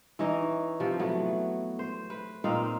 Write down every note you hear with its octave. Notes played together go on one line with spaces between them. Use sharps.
E3 C#4 D#4 D#5
C3 F3
E3 F#3 A3 B3
C5
B4
A#2 C4 D#4 F5